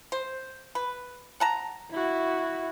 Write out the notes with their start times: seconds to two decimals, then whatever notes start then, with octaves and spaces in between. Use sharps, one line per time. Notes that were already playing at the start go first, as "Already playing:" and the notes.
0.12 C5
0.75 B4
1.40 F#5 A5 A#5
1.91 E4 F#4